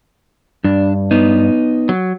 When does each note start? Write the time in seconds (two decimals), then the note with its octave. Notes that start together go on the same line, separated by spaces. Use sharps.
0.64 G2 D4
1.11 B3 D#4
1.89 F#3